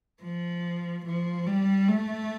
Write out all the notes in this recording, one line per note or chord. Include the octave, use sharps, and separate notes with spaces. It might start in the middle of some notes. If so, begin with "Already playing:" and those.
F3
F3
G3
A3